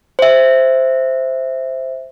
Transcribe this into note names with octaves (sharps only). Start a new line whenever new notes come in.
C5 E5